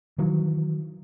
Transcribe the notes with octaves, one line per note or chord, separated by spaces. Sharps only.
D#3 E3 F#3